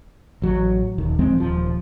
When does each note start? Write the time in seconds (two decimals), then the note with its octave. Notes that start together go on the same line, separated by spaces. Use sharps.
0.42 A1 F#3
0.98 D#1 D#3
1.19 D1 F3 G#3 C4
1.38 D#1 F3